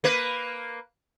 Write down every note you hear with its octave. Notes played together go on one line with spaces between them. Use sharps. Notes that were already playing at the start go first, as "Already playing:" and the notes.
A#3 B4